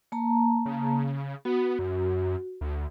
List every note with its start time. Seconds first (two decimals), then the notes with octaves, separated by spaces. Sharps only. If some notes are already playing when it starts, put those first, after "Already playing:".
0.12 A#3 A5 A#5
0.66 C#3
1.45 B3 F#4
1.79 F#2
2.61 D2